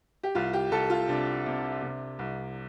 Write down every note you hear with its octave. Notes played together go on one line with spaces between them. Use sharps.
G4
C2 F4
G4
C2 A4
F4
C3 D4
C3
C3
C2